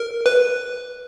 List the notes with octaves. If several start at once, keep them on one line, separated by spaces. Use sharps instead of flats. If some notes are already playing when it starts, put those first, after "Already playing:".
Already playing: A#4
B4